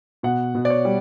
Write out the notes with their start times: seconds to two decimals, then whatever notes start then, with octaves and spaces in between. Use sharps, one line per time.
0.23 B2 F#5
0.55 B2
0.65 D5
0.70 C#5
0.85 G3